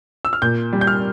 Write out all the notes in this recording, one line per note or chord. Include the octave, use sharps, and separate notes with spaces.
E6
F6
A#2 G6
G3
G6
F6